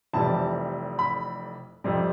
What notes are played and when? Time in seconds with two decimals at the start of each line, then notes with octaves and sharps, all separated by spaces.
0.13 F1 F2 E3 G3 A5
0.99 B5
1.84 F2 C3 G3